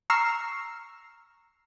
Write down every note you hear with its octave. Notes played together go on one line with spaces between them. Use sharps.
A#5 C#6 E6 F6 C7